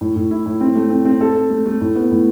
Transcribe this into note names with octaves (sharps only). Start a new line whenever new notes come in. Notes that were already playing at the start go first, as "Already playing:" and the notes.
A2
A2
E4
A2
C4
A3
C4
C4
A4
A4
A3
A3
A2
B3
A2